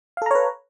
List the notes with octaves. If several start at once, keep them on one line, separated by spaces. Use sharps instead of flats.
A4 B4 C#5 F5 A#5